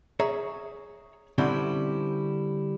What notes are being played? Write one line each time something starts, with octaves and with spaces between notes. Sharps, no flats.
G#4 C#5 E5 A#5
D3 G3 C4 C#4 E4